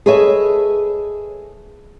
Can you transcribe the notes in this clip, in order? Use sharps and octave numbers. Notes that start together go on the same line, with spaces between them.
G#4 A4 B4 C#5 D#5 E5